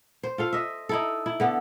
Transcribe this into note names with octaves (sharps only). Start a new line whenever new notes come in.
C5
F4 A4 F5
D#5 E5
D#4 E4 A4
E4
D3 B3 A4